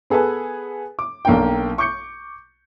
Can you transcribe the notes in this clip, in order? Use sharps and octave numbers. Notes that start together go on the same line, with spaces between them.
B3 G#4 A4 B4 G#5
D6
B1 A#3 D4 G5
C#6 D6 G6 C#7